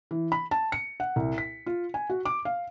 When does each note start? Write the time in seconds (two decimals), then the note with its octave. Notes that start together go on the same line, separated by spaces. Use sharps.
0.11 E3
0.32 B5
0.51 A5
0.72 C#7
1.00 F#5
1.16 C2
1.38 B6
1.66 F4
1.94 G#5
2.10 F#4
2.25 D6
2.45 F5